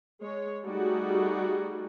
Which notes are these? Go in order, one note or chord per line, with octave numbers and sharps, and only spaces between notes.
G#3 C#5
G3 A3 D#4 F#4 G#4